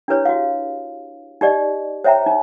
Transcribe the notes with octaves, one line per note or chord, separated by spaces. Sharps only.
D4 E4 G4 B4 C#5
F#4 F5
D#4 G4 D5 D#5
C5 C#5 E5 G5 A#5
D#4